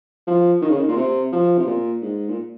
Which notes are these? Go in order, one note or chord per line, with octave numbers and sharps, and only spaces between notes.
F3
D#3
C#3
D#3
A#2
C3
F3
C3
A#2
G#2
A#2